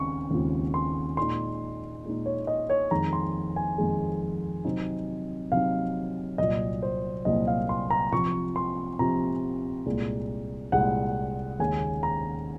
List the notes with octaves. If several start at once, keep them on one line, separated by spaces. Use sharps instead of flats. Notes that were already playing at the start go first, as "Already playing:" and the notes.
Already playing: D#2 C#3 G#3 C4 C#6
D#2 C#3 G#3 C4 F4
C6
A#2 G#3 D#4 C6
A#2 G#3 D#4
C#5
D#5
C#5
F2 D#3 G#3 A#5
C6
G#5
F2 D#3 G#3
C3 F#3 C4 D#4
C3 F#3 C4 D#4 F5
C2 A#2 F#3 A#3 D#5
C5
C2 A#2 F#3 A#3 D#5
F5
C6
A#5
C3 F3 C4 F4 C#6
C6
C3 F3 C4 F4 A#5
C2 A#2 G#3
C2 A#2 G#3 F#5
D#2 C#3 G#3 C#4 G#5
A#5